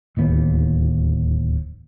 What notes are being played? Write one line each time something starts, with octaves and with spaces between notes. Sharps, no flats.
D1 D#2 B3